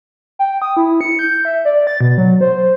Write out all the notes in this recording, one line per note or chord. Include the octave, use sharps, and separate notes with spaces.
G5
D#6
E4
C#7
G6
E5
D5
A6
B2
F#3
C5